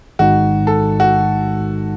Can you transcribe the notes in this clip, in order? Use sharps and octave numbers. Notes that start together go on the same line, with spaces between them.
A1 G#2 D#3 G#3 D#4 F#4
A4
F#4